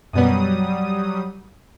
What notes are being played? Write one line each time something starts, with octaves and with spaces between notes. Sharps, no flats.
F#2 B2 F#3 G3 B3 D#6